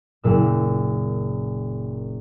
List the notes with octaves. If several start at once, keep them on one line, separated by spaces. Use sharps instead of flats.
F#1 A#2 E6